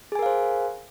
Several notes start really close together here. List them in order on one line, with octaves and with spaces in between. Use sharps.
G#4 G#5 A#4 F5 C5